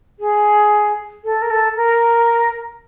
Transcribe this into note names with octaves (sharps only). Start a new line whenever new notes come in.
G#4
A4
A#4
A4
A#4